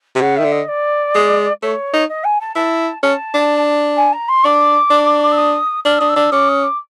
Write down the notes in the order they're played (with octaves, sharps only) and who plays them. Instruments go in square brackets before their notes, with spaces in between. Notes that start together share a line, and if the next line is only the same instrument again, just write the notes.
[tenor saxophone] C3
[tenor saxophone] C#3 [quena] F#5
[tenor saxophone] D#3 [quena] E5
[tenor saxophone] D3
[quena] D#5
D5
[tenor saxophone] G#3
[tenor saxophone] A3 [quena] C#5
[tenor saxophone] D#4
[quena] D#5
G#5
A5
[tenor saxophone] E4 [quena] A5
[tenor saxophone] C#4 [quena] A5
[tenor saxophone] D4
[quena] G#5
A#5
C6
[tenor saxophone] D4 [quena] D6
[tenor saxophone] D4
[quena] E6
D#6
[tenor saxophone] D4 [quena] F6
[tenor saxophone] D4 [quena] D#6
[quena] E6
[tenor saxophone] D4
[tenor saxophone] C#4 [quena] D6
[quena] D#6
D6